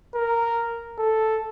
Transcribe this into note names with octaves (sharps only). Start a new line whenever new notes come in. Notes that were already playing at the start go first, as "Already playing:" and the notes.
A#4
A4